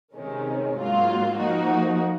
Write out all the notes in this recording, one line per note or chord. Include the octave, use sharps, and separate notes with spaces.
C3 D#3 G#3 C#4
G#2 F#3 A#3 F4
F3 A#3 D#4 F#4